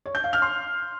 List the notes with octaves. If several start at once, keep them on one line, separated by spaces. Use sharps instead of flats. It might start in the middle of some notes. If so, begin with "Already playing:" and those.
C#5
G6
F5
F6
C6